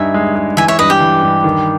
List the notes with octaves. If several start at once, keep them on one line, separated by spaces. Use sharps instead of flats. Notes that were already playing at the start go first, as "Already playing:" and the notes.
Already playing: G2 D#4 E5 G#5
G#3
G#3
E3 E5 G#5
C#5 E5
G2 B4 D#5
G4
E3
G2
D#3